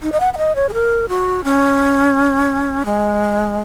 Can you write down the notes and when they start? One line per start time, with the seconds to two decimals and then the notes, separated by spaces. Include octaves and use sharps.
0.02 D#4
0.12 D#5
0.20 F#5
0.34 F#5
0.38 D#5
0.56 C#5
0.69 G#4
0.74 A#4
1.09 F#4
1.44 C#4
2.86 G#3